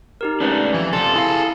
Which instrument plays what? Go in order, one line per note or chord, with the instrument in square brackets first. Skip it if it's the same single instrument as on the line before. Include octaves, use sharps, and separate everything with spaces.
[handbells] D#4 G4 A#4
[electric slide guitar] G#3 A3 D4 [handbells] C#4 B4 D5
[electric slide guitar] F2 [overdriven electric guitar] E3
[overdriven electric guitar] C3 F4 [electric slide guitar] A4 [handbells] A6
[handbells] E4 F5 [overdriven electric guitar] G#4 A5